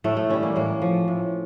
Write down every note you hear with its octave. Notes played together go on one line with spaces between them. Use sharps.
A2 A3
A3
E3 G3 C#4
A#3
A2 A#3
F3
A2